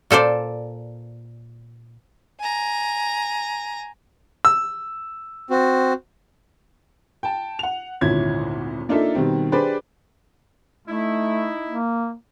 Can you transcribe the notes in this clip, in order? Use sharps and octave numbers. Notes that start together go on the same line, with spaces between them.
A#2 A4 C5 D5
G#5 A#5
E6
C4 F#4
G5 A5
F#5 F7
G#1 D2 A#2 C#4 E4 G#6
A#3 D4 D#4 F4 A4 E5
B2 D#3 G3 C4
D4 G4 G#4 B4 C5 D5
A3 D#4 E4
A#3